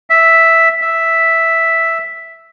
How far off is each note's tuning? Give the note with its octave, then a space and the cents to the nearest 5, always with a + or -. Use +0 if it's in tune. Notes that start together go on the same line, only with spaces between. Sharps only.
E5 +0
E5 +0